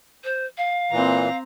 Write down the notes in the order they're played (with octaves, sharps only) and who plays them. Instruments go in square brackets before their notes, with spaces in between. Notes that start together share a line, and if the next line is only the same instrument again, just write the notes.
[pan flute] C5
F5
[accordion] A#2 E3 [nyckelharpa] C4 A#5